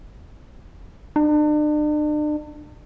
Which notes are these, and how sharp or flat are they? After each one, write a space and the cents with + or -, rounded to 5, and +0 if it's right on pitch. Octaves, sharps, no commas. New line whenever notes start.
D4 +40